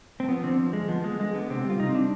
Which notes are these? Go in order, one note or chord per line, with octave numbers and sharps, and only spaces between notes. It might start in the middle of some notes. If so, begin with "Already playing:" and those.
C4
F3 B3
D3 C4
F3
F3 G#3
F3 B3
F3 G#3
D3 G#3
D3 B3
C3 C4
G3
F4
C3 D#4
C4
G3 D4